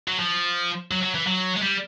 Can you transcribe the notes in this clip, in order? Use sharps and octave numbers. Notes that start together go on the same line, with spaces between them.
F#3
F3
F#3
F#3
E3
F#3
G#3
G3